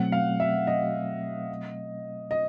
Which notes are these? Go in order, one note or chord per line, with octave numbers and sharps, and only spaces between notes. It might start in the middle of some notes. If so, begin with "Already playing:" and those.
Already playing: B2 F#3 A3 C4 F#5
F5
E5
D#5
D#5